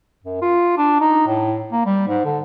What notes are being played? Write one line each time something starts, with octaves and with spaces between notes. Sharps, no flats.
F#2
F4
D4
D#4
A2
A#3
G3
G#2
D3